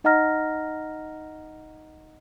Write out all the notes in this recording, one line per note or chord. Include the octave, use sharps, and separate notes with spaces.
D#4 D#5 F#5 A#5 F6 A#6